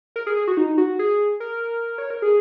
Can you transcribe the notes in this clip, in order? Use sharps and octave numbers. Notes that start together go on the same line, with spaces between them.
A#4
G#4
G#4
F#4
D#4
F#4
G#4
A#4
C#5
A#4
G#4